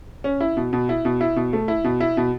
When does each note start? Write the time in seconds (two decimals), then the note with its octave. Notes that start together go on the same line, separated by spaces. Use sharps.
0.24 C#4
0.41 E4
0.57 B2
0.73 B2
0.89 E4
1.05 B2
1.21 E4
1.36 B2
1.53 A3
1.68 E4
1.84 B2
2.00 E4
2.17 B2